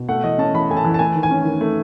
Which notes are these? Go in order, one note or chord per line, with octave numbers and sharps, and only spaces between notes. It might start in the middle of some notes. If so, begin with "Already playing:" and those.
Already playing: B2
A3 F#5
E3 D#5
C#4 A5
E3 B5
A3 G#5
A5
E3
A5
A3 G#5
D#3
G#5
C#4
D#3
A3